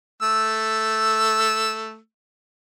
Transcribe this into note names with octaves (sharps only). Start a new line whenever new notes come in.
A3 E6